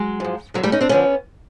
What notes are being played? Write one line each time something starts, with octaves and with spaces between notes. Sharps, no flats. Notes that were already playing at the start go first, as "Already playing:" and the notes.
Already playing: F#3 G#3
G#2 F3
D#2 D3 F3 F#3
G3 A3
C#4 D#4
C4 D4
D#2 D3 F3 B3 C#4